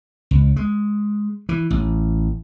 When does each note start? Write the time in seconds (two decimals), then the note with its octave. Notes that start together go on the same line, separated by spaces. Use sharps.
0.31 C#2
0.56 G#3
1.49 E3
1.70 A1